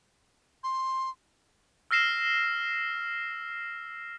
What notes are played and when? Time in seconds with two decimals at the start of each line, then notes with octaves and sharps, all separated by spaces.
0.64 C6
1.91 E6 F6 A#6 C7 E7